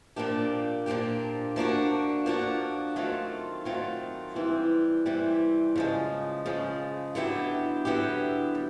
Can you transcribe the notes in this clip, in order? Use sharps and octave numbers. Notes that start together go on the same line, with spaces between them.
A#2 F3 A#3 D4 G4
A#2 F3 A#3 D4 G4
F3 A#3 D4 F#4
F3 A#3 D4 F#4
D#3 F#3 A3 C4 F4
D#3 F#3 A3 C4 F4
C3 E3 G3 C4
C3 E3 G3 C4
C#3 F3 G#3
C#3 F3 G#3
D3 F#3 B3 E4 G4
D3 F#3 B3 E4 G4
G3